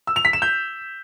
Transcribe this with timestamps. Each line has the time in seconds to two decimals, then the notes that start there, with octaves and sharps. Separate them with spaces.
0.07 E6
0.16 F7
0.25 B6
0.33 E7
0.42 G6